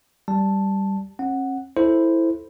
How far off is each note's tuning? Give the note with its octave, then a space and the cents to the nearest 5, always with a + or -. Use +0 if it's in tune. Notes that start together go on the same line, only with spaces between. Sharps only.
G3 +0 A5 +0
C#4 -45 F#5 +0
E4 +0 A4 +0 C5 +0